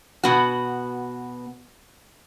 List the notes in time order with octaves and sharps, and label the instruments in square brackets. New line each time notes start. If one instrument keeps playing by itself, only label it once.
[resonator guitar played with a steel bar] B2 B3 F#4